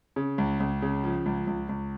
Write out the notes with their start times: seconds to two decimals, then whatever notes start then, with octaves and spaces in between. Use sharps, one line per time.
0.16 C#3
0.38 C#2
0.60 C#2
0.82 C#3
1.04 F3
1.26 C#2
1.47 C#2
1.69 C#2